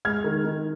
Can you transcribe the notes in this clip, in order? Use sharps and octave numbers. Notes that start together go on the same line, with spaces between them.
G#3 F6 G#6
D#3
D#3